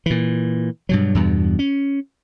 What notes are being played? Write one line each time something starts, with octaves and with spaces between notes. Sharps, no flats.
A#2 E3
G2 B2 F#3
E2 G2 B2
C#4